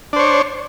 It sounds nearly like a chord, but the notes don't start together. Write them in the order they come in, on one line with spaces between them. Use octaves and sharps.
D4 C5 C#5